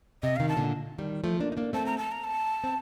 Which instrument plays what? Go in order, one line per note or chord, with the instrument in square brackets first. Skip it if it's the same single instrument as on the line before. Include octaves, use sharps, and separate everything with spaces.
[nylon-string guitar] C3 [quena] D#5
[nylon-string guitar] C3 D#3 [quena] F5
[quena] A5
[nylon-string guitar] A#2 D3
D#3 G3
F3 A3
A#3 D4
D#4
A#3 D4
[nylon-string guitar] A3 C4 [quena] A5
[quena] A#5
A5
A#5
A5
[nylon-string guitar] C4